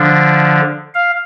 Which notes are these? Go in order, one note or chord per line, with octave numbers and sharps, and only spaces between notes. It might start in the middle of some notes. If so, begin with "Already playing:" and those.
Already playing: D3 F3 D4
F5